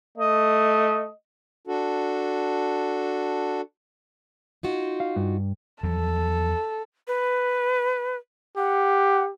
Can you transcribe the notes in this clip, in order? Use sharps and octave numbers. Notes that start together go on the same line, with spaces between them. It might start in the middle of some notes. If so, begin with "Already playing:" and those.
A3 D#5
D4 F#4 A4
D#4 F4 F#4
F5
G2
E2 F3 F#3 A4
B4
G4 F#5